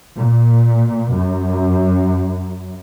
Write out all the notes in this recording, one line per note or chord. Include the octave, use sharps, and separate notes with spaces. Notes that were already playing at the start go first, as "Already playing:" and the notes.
A#2
F#2